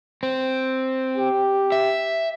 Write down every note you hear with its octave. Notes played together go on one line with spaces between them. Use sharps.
C4
G4
E5